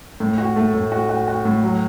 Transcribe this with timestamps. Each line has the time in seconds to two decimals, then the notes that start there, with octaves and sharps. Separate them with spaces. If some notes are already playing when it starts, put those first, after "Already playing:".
0.20 A2
0.38 F#4
0.56 A3
0.74 A2
0.92 F#4
1.09 F#4
1.28 F#4
1.45 A2
1.63 F#3